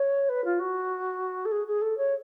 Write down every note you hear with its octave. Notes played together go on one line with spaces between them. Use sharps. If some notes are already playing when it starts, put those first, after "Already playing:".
Already playing: C#5
B4
F4
F#4
A4
G#4
G#4
A4
C#5